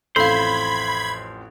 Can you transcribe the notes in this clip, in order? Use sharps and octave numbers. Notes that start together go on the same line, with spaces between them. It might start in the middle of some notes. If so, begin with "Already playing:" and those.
A1 F2 A2 A4 C5 F5 B5 G#6